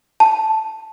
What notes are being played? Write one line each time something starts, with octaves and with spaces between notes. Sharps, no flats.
A5